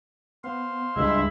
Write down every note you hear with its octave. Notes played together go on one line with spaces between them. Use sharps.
B3 C5 F5 C6
C#2 G2 G#3 E4 E5